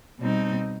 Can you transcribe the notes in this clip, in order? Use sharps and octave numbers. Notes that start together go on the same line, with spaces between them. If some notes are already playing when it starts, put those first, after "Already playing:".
B2 G3 C4 D#4